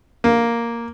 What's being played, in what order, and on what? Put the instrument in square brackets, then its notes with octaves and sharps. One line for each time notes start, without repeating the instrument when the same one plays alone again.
[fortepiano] A#3